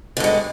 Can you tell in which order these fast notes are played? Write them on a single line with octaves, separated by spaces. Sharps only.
D3 G2 G#3